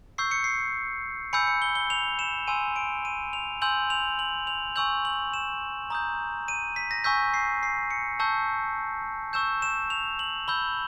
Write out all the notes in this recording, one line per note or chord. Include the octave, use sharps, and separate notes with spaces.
C#6 E6 G6 C7
C#7
C7
G#5 B5 E6 G6 C#7
C#7
G7
G7
F7
E7
G#5 C6 E6 D#7
D7
D#7
F7
G#5 C6 E6 G6 F#7
F7
F#7
F7
G#5 C#6 E6 G6 F#7
F#7
E7
A#5 D#6 G6
D#7
B6
A#6
G#5 C#6 E6 G6 B6
C7
C7
C#7
A5 C#6 E6 G6
C#6 E6 G6 E7
E7
F7
F#7
B5 E6 G6 G7